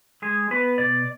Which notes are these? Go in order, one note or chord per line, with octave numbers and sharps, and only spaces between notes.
G#3 G#4
B3 B4
B2 D5